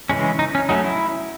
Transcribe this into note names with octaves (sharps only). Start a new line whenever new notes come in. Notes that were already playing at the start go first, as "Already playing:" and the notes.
C#3 E3 G#3 C#4
D#4
C#4
F#3 A3 C#4 D#4
E4